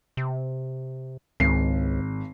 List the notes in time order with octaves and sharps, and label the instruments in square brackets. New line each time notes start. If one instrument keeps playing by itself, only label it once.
[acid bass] C3
[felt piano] G#1 C7 [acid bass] C#2